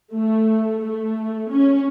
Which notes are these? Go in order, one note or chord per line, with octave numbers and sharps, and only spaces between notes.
A3
A3
C#4